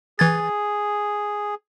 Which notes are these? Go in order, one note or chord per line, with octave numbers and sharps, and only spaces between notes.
E3 G#4 G#6 A6